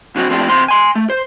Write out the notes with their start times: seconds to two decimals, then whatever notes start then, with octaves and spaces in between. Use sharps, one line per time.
0.16 D3 F#3 C4 F#4
0.30 F3 A3 C4 D4 G4
0.48 E2 C3 C5 C6
0.68 G#5 C6
0.95 A3
1.10 C5